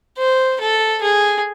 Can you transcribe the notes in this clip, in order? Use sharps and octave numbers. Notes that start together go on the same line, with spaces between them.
C5
A4
G#4